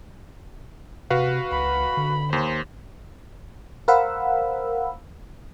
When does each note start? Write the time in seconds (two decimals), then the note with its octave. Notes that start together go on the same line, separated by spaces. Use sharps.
1.10 C3 F#4 B4 F5
1.51 C#2 B5
1.97 D3
2.33 D#2 C5
3.88 A#4 C5 F5 F#5 B5 E6